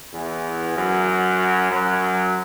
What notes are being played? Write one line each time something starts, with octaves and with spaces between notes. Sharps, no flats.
E2 E3
F#2 F#3
F#2 F#3